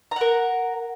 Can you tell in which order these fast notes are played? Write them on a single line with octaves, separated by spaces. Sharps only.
A#5 F#5 A#4